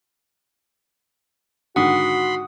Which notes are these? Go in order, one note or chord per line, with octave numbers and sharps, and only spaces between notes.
G#2 D3 D#3 F#4 F#5 B5 C6 D#6